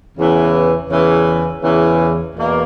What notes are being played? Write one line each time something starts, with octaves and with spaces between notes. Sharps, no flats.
E2 C#3 E3
E2 C#3 E3
E2 C#3 E3
E2 B2 A#3